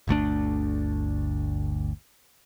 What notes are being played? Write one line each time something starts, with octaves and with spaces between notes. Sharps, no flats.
G1 D2 A3 D4